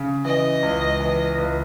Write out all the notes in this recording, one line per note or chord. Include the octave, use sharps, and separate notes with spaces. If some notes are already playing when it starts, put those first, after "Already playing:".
Already playing: C#3
E3 D#5
C#2
E3
C#2